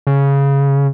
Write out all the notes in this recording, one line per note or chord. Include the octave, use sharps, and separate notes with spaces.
C#3